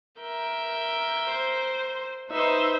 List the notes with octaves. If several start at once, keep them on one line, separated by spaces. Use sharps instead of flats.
A#4 E5 G6
C5
D#4 B4 C5 D#5 E5